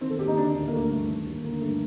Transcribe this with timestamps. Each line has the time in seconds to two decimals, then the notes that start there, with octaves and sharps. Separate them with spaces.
0.01 D#3 C4
0.10 A4
0.18 D#2 G4
0.28 D#4
0.37 D3 D4
0.55 D2
0.68 A#3
0.72 D3 A3
0.91 G2
1.08 D#3
1.26 D#2
1.44 D3 A#3
1.61 G2 A3